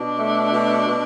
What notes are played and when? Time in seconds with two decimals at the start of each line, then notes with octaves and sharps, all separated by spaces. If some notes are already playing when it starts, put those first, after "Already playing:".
Already playing: B2 D4
0.18 A3
0.52 B2
0.87 B2